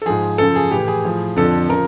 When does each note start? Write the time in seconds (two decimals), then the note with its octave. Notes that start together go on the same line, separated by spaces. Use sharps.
0.02 A4
0.06 G#2 F3 G#4
0.38 F#2 C#3 F3 A4
0.56 G#4
0.71 A2 E3 G4
0.88 G#4
1.04 A2 F3
1.36 F2 D3 F3 A4
1.69 C#3 F3 A#4